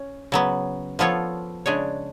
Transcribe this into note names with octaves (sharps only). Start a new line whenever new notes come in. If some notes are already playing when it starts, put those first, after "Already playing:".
Already playing: C#4
C#3 F#3 B3
F3 B3 F4 A4 C#5
C#3 G#3 D4 G#4 C#5